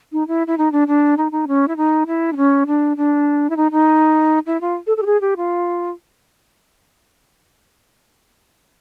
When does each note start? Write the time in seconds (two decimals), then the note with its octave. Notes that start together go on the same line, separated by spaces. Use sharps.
0.12 D#4
0.28 E4
0.47 E4
0.58 D#4
0.72 D4
0.88 D4
1.17 D#4
1.32 D#4
1.48 C#4
1.68 E4
1.77 D#4
2.07 E4
2.33 D4
2.37 C#4
2.67 D4
2.97 D4
3.50 E4
3.57 D#4
3.72 D#4
4.46 E4
4.61 F4
4.87 A4
4.97 A4
5.02 G4
5.06 G#4
5.21 G4
5.37 F4